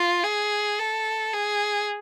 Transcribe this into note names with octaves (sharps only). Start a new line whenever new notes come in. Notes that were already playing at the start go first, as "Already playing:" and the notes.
Already playing: F4
G#4
A4
G#4